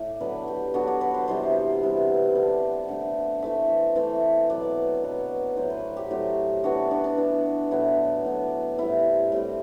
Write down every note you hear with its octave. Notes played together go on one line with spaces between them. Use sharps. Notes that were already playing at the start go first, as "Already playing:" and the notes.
Already playing: A2 D5
D3 F#3 B3 D4 B4
G4
D3 F#3 B3 D4 F#4
D5
B4
C5
C3 E3 G3 B3 C5
C3 E3 G3 B3
D3 A3 D4 D5
D3 A3 D4
E3 A3 C4 E5
E3 A3 C4
B2 F#3 B3 D5
B2 F#3 B3
A2 F#3 C4 C5
B4
G4
A2 F#3 C4
E3 B3 D4 F#4
D4
D4
E3 B3 D4
A2 F#3 B3 D4 E4
A2 F#3 B3 D4
A2 G3 C4 E4
A2 G3 C4